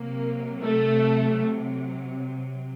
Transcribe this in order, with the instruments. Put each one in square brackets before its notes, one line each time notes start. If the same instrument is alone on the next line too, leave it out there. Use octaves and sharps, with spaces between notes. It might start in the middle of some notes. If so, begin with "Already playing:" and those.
Already playing: [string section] C3 F#3 A#3
A3